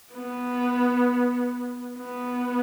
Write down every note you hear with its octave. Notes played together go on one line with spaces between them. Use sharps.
B3
B3